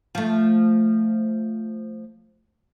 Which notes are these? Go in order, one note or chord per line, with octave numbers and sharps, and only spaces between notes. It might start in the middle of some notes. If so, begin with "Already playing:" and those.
F3 A3